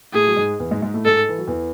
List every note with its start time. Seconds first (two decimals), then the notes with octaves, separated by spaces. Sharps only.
0.13 A2 A3 G#4
0.27 F#3
0.36 G#2 G#3
0.59 E2 E3
0.71 G#2 G#3
0.82 G#2 G#3
0.94 A2 A3
1.05 G#2 G#3 A4
1.29 E3
1.38 F#3
1.47 E2 E3